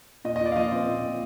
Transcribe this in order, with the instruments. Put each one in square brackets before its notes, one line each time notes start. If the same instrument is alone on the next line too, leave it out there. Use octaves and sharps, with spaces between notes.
[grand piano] A#2 D#5
D#5
A#2 D5
F5
F3 D#5
C4
A#2
A#2